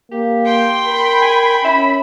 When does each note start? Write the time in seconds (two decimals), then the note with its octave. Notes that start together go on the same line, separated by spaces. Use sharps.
0.12 A#3 G4
0.46 G5 C6
0.87 A#4 B5
1.22 G#5
1.65 C#4 E5